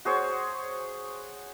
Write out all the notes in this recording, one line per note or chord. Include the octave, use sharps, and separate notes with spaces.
F#4 G#4 C5 C#5